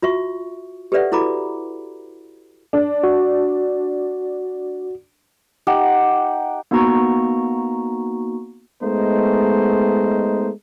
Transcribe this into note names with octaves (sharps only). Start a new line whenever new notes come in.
F4 F#4 E5 C#6
G4 A4 B4 D5 E5 F#5
E4 F#4 A4 A#5 B5 D6
D4
F#4
D#4 G4 F#5
A#3 B3 D#4 F#4 A#5 C#6
G#3 A3 B3 D#4 C5